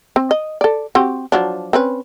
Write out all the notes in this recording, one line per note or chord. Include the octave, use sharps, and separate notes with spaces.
C4
D#5
A4 D5
C4 F#4 G4
F3 F#3 D4
C4 C#4 B4